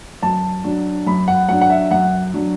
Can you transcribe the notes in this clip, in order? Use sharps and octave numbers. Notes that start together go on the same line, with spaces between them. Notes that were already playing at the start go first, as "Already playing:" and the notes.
F#2 A5
F#3 D4
F#2 B5
F#5
F#3 D4 F#5
F#5
E5
F#2 F#5
F#3 D4